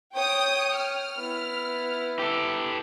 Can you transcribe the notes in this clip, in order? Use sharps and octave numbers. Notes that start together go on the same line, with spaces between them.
C#5 G5 D#6
F6
B3 E4
G4 A4